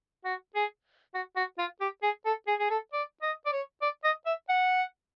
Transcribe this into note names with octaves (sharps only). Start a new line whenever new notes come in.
F#4
G#4
F#4
F#4
F4
G4
G#4
A4
G#4
G#4
A4
D5
D#5
D5
C#5
D5
D#5
E5
F#5